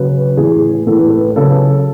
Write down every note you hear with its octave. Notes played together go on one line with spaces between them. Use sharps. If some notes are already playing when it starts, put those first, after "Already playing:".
Already playing: C#3 F#3 B4
A2 E3 G#4
A2 E3 A4
B4
A4
B4
C#3 F#3 A4